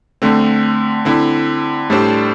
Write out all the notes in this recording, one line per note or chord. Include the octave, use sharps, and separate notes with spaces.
D3 A3 C4
D3 C4 E4
A2 G3 D4 A4 C5